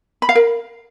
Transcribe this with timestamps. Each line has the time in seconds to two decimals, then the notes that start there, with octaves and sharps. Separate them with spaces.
0.22 B5
0.29 F5
0.35 A#4